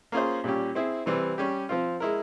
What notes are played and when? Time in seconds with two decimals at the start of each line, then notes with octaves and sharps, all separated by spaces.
0.12 A#3 C#4 F4 G#4 C5
0.44 A#2 G3 C#4 G4
0.75 C4 E4 G#4
1.06 C3 E3 G3 C4
1.38 G3 C#4 G4
1.69 F3 C4 F4
2.00 G#3 E4 A#4